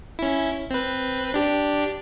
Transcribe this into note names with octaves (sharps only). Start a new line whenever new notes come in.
C#4 E4
C4 B4
D4 G4